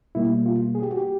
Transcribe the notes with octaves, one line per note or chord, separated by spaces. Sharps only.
B2 G3 A#3 E4
F4
G#4
G4
F#4
G4